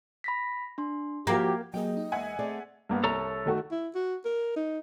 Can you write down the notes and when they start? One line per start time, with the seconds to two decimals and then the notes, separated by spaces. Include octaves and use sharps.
0.24 B5 A#6 B6
0.78 D4 C6
1.27 F3 A#3 F#4 G4 G#6
1.74 F#3 A#3 G4 G#4 D#5 G5
1.97 D#4
2.12 E2 G#3 A#3 E5 F#5 G#5 G#6
2.39 A3 C4 G#4 D5
2.89 G2 A#3 B3
3.04 C2 A4 C#5 A#5
3.46 D#3 A3 F#4
3.71 E4
3.95 F#4
4.25 A#4
4.56 D#4